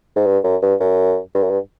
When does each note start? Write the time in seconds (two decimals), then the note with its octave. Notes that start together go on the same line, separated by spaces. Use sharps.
0.16 G#2
0.26 G2
0.44 F#2
0.62 G2
0.80 F#2
1.35 G2
1.43 F#2
1.50 G2